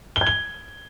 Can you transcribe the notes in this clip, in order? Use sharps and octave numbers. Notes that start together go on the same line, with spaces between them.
G7
G#6
G7